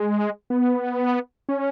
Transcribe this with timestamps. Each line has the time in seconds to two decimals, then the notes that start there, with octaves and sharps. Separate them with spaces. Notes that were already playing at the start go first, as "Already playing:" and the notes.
Already playing: G#3
0.50 B3
1.49 C#4